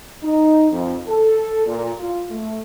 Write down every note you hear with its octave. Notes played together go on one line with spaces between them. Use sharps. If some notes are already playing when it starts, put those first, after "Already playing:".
D#4
F2
A4
A#2
F4
A3